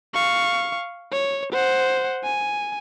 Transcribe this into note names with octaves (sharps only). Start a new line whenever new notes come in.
F5 C#6
C#5
C5 F#5
G#5